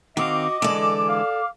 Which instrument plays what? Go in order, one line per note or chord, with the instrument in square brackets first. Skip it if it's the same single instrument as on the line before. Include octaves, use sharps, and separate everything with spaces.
[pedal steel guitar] D#3 C4 F5 [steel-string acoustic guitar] F#4 [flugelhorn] D#5 [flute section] D6
[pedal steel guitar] D3 E3 G#3 [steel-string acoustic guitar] A4 D5
[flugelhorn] F5